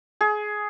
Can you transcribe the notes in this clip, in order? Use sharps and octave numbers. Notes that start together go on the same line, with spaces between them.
G#4